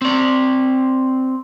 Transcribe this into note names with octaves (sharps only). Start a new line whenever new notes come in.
C4 D5